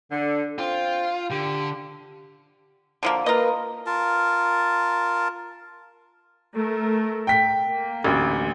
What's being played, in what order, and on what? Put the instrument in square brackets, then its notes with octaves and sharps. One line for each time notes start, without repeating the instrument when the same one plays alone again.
[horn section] D3
[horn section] C4 G5 [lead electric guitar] F4
[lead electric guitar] D3 [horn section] G4
[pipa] D3 F3 A#3
[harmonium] A#3 A#4 B4 [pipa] F4 D#5
[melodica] F4 A#4 A5
[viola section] A3 A#4
[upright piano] G5 B6
[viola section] A#3
[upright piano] A1 D2